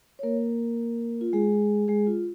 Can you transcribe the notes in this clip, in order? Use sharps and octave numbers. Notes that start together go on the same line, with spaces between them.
C#5
A#3 A#4
F4
G#3 G#4
G#3 G#4
F4